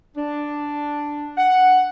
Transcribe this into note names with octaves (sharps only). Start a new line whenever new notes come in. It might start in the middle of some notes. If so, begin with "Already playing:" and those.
D4
F#5